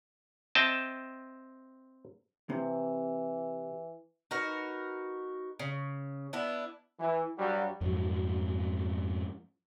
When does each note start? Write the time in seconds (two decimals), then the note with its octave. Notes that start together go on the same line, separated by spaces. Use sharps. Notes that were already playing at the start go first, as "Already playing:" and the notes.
0.55 C4 D#5 E5 G5 A5
2.50 C3 E3
4.31 D#4 F#4 A#4 B4
5.59 C#3
6.33 B3 D4 E4
7.00 E3
7.38 G2 F#3 G3 F#4
7.81 F2 G#2 F#3